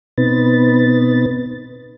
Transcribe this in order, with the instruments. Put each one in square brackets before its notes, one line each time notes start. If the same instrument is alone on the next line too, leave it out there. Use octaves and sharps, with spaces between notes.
[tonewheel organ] B2 B3 C4 D#4 B4 A6